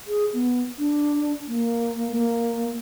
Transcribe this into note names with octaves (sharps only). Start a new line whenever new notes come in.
G#4
B3
D4
A#3
A#3